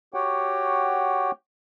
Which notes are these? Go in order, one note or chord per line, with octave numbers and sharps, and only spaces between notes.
F#4 G4 C#5 F#5 G5